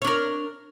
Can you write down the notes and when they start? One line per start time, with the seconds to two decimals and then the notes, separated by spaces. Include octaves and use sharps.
0.02 C#5
0.04 D4
0.07 A#4